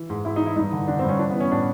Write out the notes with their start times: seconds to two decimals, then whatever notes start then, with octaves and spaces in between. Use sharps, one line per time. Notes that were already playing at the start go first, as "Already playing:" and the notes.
Already playing: E3
0.10 G#2
0.25 G#2 E4
0.36 D#4
0.41 E3 E4
0.56 G2 D#4
0.72 D3
0.87 D3 D4
0.99 C4
1.04 G2 C#4
1.19 E3 D4
1.30 B3
1.35 E3
1.40 C#4
1.51 A2 D4